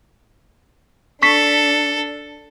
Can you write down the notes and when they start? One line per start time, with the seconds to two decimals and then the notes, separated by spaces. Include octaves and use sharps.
1.22 D4 A4 C#6 B6 C7